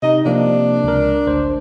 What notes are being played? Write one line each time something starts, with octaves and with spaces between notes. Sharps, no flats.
C3 D#4 D#5
C3 F3 A#3 D4
C#2 A#4
A1 D2 C5